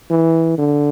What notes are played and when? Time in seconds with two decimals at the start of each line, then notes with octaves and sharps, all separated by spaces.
0.10 E3
0.58 D3